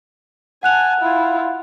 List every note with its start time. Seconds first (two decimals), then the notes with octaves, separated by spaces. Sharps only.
0.63 F#5 G#5 A5 F#6 F7
1.00 E4 F4